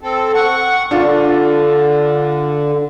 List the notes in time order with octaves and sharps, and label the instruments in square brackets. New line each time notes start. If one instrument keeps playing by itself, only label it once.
[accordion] C4 A4
F#5 C#6
[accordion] D3 [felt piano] D4 F4